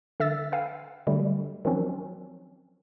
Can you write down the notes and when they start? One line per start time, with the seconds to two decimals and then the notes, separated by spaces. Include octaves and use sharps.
0.20 D3 E5 E6 A6
0.52 B4 F5 G5 G#5
1.07 D3 F#3 G3 A3
1.65 D#3 F3 F#3 C4 C#4